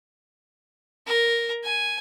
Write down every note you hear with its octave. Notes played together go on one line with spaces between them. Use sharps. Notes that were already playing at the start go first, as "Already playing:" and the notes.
A#4
G#5